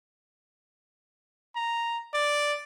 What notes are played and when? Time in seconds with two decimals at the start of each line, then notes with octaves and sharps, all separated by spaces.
1.56 A#5
2.14 D5